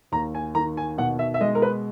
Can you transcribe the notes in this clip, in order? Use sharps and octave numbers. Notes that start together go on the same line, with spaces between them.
D#2 A#5
G#5
D#3 A#5
G#5
B2 F#5
E5
E5
G#3 D#5
A#4
B4